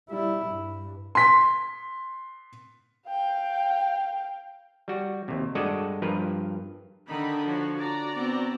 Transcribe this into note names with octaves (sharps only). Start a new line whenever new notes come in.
G3 E4
G2
C6 B6
F5 G5
G3 F#4
D#2 C3
G2 G#3 F#4 A4 D5 D#5
G2 F3 A#4 B4
D3 D#3 D#4 B5
F3 F#4 C#5
F#4 D5 A#5
B3 C4